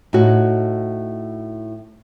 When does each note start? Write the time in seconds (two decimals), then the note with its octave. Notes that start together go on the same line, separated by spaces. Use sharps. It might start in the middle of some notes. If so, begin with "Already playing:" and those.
0.13 A2 D#4 F#4